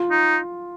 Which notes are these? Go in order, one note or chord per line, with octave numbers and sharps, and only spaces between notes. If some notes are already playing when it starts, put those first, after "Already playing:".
Already playing: F4
D#4